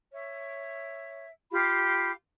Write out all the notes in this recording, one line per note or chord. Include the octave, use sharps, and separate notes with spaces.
C#5 E5
F4 G4 F5 B5